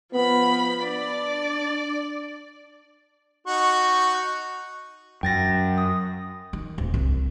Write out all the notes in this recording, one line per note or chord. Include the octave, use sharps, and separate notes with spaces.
F3 B3 B5
D4 D5
D#4 F#4 C#6
F#2 G5 A6 A#6
D#6
D#3
D1
C2